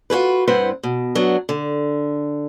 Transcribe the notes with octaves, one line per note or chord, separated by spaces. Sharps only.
F4 F#4 G#4 B4
G2 C4 E4 B4 C5 F#5
B2
F#3 B3 D4
D3